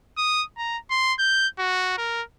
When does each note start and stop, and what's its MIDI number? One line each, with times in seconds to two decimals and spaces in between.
0.18 0.43 87
0.57 0.77 82
0.90 1.13 84
1.19 1.47 91
1.59 1.94 66
1.98 2.22 70